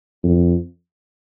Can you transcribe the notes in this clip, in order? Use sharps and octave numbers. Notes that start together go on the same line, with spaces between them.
F2